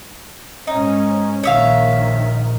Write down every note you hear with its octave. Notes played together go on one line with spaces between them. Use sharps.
G#2 C#4 D#4
A#1 D#3 C#5 E5 F5